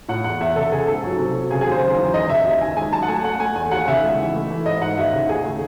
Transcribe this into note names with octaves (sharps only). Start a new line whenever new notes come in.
A2 F#5
E2 F#5
E2 E5
C#3 A4
C#3 G#4
G#2 A4
F#3
C3
F#3
C#3 G#4
G#4
D#2 C5
F#2
E3
C#2 D#5
C#2 E5
D#2
D#3 G#5
G#3 G#5
F#2 A5
F#5
A3 G#5
A3 F#5
A3 G#5
E2 G#5
D#2 F#5
C#3 E5
G#3
E3
A3
E3
G#2 D#5
G#2 F#5
D#2 E5
C#3
D#2 G#4
A3